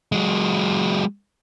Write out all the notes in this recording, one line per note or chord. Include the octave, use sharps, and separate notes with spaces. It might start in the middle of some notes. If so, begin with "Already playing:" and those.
F#3 G#3